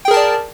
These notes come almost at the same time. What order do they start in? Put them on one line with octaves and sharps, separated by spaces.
G5 G#4 A#4 A5 D5